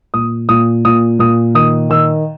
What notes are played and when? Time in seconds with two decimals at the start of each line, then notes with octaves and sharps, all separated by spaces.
0.14 A#2 D#6
0.49 A#2 D#6
0.85 A#2 D#6
1.19 A#2 D#6
1.55 D#3 D#6
1.90 D#3 E6